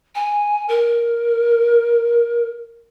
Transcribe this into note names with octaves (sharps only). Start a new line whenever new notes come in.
G#5
A#4